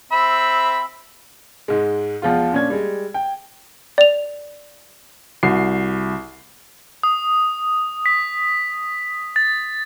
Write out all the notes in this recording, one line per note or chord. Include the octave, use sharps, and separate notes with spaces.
C4 E5 B5
G#2 G#3
E2 F3 G#3 F4
A#2 C#4 D4 G#6
G3 G#3
G5
D5 F7
C2 F#4 C7
D#6
B6
A6